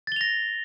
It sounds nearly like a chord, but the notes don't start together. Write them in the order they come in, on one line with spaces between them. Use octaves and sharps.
A6 G7 F7 A#6